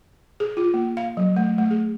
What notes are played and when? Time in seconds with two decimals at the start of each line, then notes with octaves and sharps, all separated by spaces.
0.40 G#4
0.57 F4
0.74 A#3
0.97 F5
1.17 F#3
1.37 A3
1.58 A3
1.71 G#4